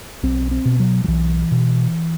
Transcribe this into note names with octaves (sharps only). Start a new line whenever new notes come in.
B1 C4
C4
B2
F#3
F#3
B1 E3
B2